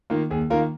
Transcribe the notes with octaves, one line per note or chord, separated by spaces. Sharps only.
D#3 A#3 F4
D#2 G#4
D#3 A#3 F4 A#4